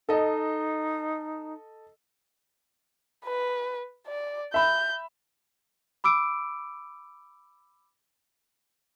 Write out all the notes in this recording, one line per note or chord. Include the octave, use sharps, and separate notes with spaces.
D#4 A4 D#5
B4
D5
E5 B5 G6
B5 D6 E6 D7